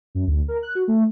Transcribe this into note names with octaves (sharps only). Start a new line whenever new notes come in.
F#2
D2
A#4
F#6
F#4
A3